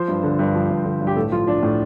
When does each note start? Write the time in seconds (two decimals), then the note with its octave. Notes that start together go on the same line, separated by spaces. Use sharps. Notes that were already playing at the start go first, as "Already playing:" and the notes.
Already playing: F3 C5
0.08 G2
0.23 D3
0.39 G2
0.55 F3
0.70 G2
0.85 D3
1.01 G2
1.07 G4
1.16 A2 A4
1.32 F3 F4
1.47 F3 D4
1.63 A2